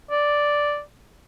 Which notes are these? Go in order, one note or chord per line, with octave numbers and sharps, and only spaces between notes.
D5